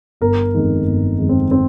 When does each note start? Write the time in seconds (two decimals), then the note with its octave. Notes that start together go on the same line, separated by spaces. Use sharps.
0.21 G1 A#4
0.54 F2 D#3 G#3
0.86 G1
1.18 F2 D#3 G#3
1.29 C4
1.51 C4